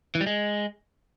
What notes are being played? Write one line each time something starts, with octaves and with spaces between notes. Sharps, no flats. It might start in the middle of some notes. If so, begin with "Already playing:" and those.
E3
G3
G#3